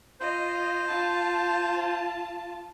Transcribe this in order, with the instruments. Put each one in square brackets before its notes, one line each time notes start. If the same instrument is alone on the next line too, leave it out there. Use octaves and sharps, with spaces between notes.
[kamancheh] F4 D#5 [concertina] C5
[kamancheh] F4 A5